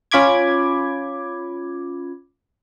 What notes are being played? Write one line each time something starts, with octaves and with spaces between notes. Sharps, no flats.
C#4 F4 B5 D6 G#6